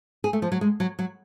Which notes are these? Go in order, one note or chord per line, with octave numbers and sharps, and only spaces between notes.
G#4
A3
F3
F#3
G#3
F#3
F#3